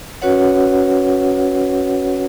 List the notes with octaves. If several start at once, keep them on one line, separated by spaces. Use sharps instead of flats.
C#4 F#4 B4 C#5 F#5